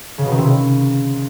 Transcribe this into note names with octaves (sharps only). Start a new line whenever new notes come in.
C#3
B2
D#3
C3
C#3